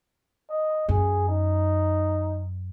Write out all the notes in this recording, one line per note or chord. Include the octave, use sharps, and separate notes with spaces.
D#5
F#2 G#4
D#4